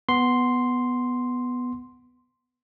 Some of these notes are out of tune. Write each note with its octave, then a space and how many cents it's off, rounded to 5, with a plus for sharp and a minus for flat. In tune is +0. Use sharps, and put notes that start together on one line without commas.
B3 +0 C6 +0